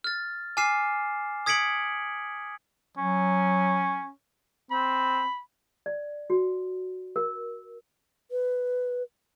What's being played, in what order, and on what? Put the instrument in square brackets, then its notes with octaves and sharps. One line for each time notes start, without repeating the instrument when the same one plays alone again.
[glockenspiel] F6 A6
G#5 D6 F6 C7 E7
D#6 G#6 B6 C#7 D7 F#7
[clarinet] F#3 [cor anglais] C#4
[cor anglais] C4 [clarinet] B5
[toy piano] D5
F#4
A#4
[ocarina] B4